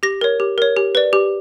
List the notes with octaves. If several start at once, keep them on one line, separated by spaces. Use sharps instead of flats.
G4 A#6
A#4 C#5
G4
A#4 C#5
G4
B4 D5
G4